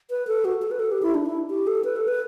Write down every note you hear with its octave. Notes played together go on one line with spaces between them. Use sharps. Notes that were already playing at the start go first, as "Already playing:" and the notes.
B4
A4
F#4
A4
B4
A4
G4
E4
D4
E4
G4
A4
B4
A4
B4